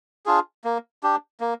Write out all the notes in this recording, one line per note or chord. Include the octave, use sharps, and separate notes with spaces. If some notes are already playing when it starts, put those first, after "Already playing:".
D4 F4 G#4
A#3
D4 G4
A#3